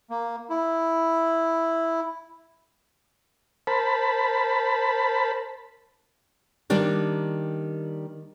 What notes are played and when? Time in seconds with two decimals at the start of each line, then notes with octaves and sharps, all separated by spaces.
0.10 A#3
0.50 E4
3.67 A#4 C5 A5 B5
6.70 D#3 G3 A#3 D4 G4